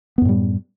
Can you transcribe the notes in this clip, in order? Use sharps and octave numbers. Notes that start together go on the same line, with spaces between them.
F#2 A2 G3 B3